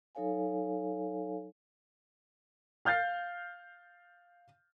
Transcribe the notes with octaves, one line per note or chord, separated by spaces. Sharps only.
F#3 D#4 A4 C#5 F5 G#5
F5 F6 G6 A6 C7